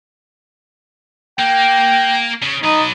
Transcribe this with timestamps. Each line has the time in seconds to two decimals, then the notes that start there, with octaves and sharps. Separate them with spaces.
1.39 A#3 G5
2.42 C#3
2.64 F#3 D#4 B4